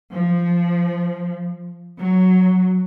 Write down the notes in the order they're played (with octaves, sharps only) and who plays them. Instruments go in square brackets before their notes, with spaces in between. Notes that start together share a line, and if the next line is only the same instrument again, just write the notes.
[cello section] F3
F#3